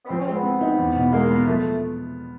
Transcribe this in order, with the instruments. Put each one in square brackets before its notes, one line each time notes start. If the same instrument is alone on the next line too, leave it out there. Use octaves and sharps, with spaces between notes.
[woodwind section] B3
[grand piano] F3 [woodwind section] C4
[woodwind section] C#4
[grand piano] G#3 [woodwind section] C4
[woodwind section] B3
[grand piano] C4
D#4
E2
B2
[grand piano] G#3 [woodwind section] A#3
[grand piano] B3
[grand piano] F3 [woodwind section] A3